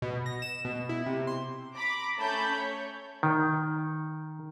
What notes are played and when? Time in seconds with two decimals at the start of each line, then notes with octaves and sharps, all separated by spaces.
0.02 B2
0.26 A#6
0.42 E7
0.65 B2
0.89 E4
1.06 C3
1.27 C6
1.76 A#5 B5 D6
2.18 A3 C#4 A5 B5 G6
2.54 C#5
3.23 D#3